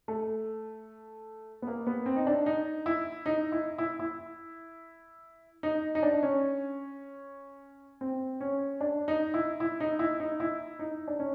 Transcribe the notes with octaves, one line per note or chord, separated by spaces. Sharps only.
A3
B3
A#3
B3
C4
D#4
D4
D#4
E4
D#4
E4
E4
E4
D#4
D#4
D4
C#4
C4
C#4
D4
D#4
E4
E4
D#4
E4
D#4
E4
D#4
D4
C#4